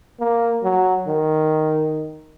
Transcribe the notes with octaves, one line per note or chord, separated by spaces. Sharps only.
A#3
F#3
D#3